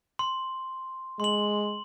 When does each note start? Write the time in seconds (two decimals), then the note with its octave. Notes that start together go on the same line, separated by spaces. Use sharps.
0.19 C6
1.20 G#3 C6 F#7